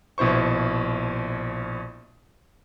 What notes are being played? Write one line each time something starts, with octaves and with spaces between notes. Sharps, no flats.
A#1 B2 E4 C5 C#6